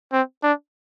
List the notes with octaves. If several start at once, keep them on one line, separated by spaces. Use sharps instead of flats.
C4
D4